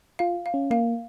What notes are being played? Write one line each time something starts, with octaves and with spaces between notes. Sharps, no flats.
F4 F5
F5
C#4
A#3 F5